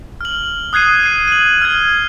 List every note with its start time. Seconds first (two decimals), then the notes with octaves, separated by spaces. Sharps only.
0.21 F6 F#7
0.73 D#6 F#6 G#6 C7 D#7
1.03 C7 D#7
1.28 D#7 F#7
1.62 F6 G#6